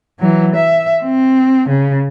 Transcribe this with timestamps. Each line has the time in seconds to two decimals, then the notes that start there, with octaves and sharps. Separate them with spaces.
0.19 E3 F#3
0.55 E5
1.03 C4
1.69 C#3